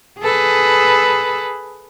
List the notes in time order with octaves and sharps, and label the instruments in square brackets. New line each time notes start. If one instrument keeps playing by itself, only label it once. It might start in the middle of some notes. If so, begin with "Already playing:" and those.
[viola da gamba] G#4 A4 B4